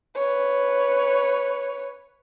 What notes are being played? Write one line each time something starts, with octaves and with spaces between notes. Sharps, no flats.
B4 C#5